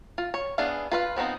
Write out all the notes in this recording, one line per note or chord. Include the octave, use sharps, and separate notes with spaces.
F4
C#5
B3 D4 E4 G#4 F5
F4 B4 F5
F3 B3 C4 D#4